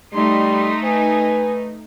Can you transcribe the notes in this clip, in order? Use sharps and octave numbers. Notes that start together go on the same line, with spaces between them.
G3 A3 D#4 C6
B4 G#5